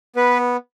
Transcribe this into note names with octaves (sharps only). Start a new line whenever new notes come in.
B3 B4